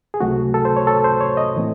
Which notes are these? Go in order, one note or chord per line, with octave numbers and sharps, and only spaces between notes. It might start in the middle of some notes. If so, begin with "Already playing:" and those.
G#4
C#2 C3 F#3 A3 C4 F#4
A4
C5
C#5
A4
C5
C#5
D#5
A2 E3 A3 C4